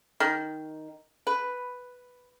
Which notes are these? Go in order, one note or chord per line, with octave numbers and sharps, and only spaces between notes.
D#3
B4